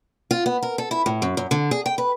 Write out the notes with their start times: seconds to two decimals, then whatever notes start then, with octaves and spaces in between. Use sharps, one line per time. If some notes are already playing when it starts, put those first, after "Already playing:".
0.31 F4
0.46 B3
0.62 A#4
0.78 A4
0.91 E4
1.06 A2
1.22 F#2
1.37 F#2
1.51 D3
1.71 G#4
1.86 G5
1.98 B4